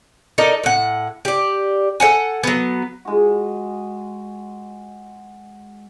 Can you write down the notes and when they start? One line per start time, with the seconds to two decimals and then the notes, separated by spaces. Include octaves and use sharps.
0.38 D#4 A4 A#4 D5
0.64 A2 F#5
1.25 G4 D5
2.00 A4 C5 F#5 G#5
2.43 F#3 B3
3.05 G#3 F#4